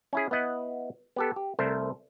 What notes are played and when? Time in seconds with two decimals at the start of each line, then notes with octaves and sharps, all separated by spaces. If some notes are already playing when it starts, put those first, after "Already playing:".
0.13 C#4 E4 G#4
0.31 B3 E4 D#5 F#5
1.16 B3 G4 A4
1.36 G4
1.59 C2 A3 A#4 C5 E5